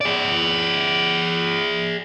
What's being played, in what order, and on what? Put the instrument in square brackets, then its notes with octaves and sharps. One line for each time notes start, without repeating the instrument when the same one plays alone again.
[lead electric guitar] G#4 D5